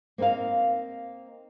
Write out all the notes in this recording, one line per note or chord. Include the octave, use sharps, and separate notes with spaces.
A#3 C4 D#4 A#4 F5